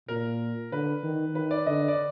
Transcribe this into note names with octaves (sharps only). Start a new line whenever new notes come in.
A#2 A#4
D3 B4
D#3
D#3 B4
D5
D3 D#5
D5